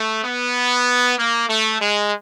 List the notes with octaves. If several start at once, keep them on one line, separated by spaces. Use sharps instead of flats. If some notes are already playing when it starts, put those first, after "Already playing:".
Already playing: A3
B3
A#3
A3
G#3